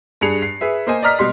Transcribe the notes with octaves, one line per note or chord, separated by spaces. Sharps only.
G2 G#4 C7 C#7 F7
C7
G#4 B4 E5
A#3 C5 D#5 G#5
D5 D#5 A#5 F6 B6
B2 G3 C6 B6